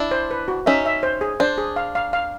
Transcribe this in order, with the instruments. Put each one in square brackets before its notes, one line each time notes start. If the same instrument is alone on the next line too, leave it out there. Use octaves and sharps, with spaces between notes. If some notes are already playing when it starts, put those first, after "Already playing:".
Already playing: [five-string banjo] D4 E4
[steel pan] C5
B4
F#4
[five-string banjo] C#4 D#4 [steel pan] E5
[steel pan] E5
C5
G#4
[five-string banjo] D4 [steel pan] C5
[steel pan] G#4
F5
F5
F5